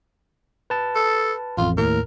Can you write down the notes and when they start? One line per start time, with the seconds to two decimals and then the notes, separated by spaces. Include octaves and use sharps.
0.70 B4 A5
0.95 A4
1.57 A1 F2 F4
1.77 D#2 A2 A#4